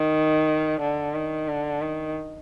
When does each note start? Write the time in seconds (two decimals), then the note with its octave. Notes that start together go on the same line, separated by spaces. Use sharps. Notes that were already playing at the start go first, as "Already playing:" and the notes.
Already playing: D#3
0.81 D3
1.14 D#3
1.47 D3
1.82 D#3